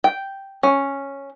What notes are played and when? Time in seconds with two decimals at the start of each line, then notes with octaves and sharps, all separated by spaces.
0.04 G5
0.63 C#4